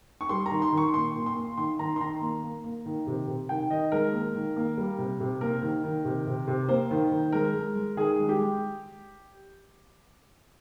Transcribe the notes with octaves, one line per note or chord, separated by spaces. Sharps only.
C#6
G3 C6
A#5
D#3
C6
D#3
C#6
A#2 C6
A#2
C6
A#3
D#3 C6
D#3 A#5
C6
D#3 A#5
A#3
A#3
A#3
D#3
C3
C3
D#3 G5
D#3 D#5
G#3 A#4
A#3
D#3
A#3
G3
C3
C3
A#3 A#4
D#3
D#3
C3
C3
C3
A#3 C5
D#3
D#3
G#3 A#4
G#3
G#3
D#3 G#4
G#3
G4
G#3